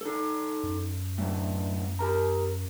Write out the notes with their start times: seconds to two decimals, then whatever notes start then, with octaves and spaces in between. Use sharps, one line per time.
0.01 D#4 A4
0.63 F#2
1.18 A2 F#3
1.99 G4 A#4 A#5